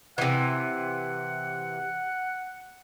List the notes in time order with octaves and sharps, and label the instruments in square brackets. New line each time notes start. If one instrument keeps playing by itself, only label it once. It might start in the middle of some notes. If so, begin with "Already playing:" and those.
[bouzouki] C3 E3 [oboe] F#5